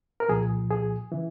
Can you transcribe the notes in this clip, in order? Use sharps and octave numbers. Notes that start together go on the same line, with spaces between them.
A#4
C2 A#2 F3 G#4
G#4
C#3 E3